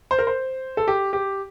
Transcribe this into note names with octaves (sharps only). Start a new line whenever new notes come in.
C5
A#4
C5
A4
G4
G4